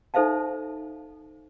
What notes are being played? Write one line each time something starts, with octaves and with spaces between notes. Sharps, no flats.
D#4 A4 C5 E5 F5 A5